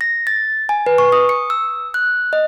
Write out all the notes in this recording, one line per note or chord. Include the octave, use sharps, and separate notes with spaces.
A#6
A6
G#5
B4
C#6
D#6
C#7
E6
F#6
D#5